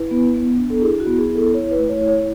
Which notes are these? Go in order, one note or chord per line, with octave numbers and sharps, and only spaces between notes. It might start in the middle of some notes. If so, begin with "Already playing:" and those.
Already playing: E4 B4
B3
B3
D4
A4
E4 G#4
F#4
B3
G#4
E4 A4
E4 C#5
B4
A3
C#5
E4
C#5